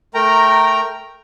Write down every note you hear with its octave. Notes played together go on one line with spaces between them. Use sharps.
A3 A#4 G5 A#5